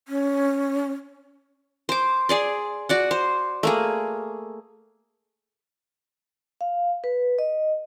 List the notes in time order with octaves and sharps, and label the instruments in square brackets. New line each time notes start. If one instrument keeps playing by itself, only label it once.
[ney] C#4
[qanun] C5 D6
G#4 D5 C6
F#4 D5 F#5
C5
A3 A#3 G#4
[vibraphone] F5
B4
D#5